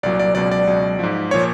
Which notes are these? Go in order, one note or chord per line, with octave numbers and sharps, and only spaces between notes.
C2 A#2 F#3 D5
D5
C#2 B2 F#3 D5
D5
C#2 B2 F#3
G#2 F3
A#2 F3 C#5